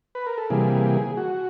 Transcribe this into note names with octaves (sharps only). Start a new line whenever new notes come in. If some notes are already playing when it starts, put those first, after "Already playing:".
B4
A#4
A4
C3 E3 G3 A#3 G#4
F#4